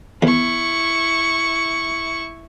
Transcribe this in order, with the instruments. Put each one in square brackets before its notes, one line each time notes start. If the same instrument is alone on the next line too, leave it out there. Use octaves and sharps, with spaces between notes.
[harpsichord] E2 [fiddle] E4 C#6